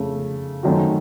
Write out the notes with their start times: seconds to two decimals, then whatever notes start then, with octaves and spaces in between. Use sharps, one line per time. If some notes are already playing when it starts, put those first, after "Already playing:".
Already playing: F2 C#3 A3
0.63 F#2 D#3 A3 C4 F#4